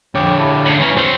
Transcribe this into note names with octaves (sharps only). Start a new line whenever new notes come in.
F2 D3 C#5 G5 D6
D4 E4 G4
A2 C#3
G2 E3 A#3 C#4
F#3 C4 C5